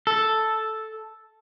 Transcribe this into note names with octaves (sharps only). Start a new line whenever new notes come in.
A4